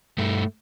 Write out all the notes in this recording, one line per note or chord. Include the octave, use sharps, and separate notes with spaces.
G2 A3